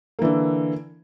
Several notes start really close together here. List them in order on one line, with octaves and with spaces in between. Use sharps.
A#3 E3 D3